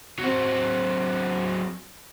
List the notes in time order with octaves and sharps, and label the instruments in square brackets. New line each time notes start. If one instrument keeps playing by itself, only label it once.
[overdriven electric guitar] F#3 C4